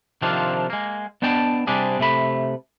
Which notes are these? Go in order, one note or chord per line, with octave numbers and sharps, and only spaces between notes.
C3 D#3 F3 C4 D4 F4
G#3 A#3
B3 D4 D#5 G5 A5
C3 G3 C4 D4 G4 G#4
C3 A3 B5